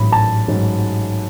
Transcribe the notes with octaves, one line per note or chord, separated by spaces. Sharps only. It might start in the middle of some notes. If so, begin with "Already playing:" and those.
Already playing: A1 G#2 F#3 B5
A5
A1 G#2 F#3